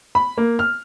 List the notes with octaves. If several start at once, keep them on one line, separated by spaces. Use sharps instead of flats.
B5
A#3
F6